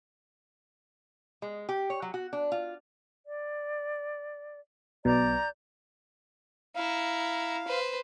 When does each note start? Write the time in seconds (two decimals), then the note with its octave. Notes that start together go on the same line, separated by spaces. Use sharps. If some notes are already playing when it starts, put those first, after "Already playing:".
1.42 G#3
1.69 G4
1.90 C#5
2.02 F#3
2.14 F#4
2.33 D4
2.52 F4
3.27 D5
5.05 B1 B2 D5 A#5 G6
6.76 E4 F5 A#5
7.67 B4 C5